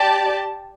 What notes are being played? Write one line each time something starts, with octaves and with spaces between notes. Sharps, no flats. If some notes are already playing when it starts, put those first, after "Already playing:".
Already playing: G4 D5 A5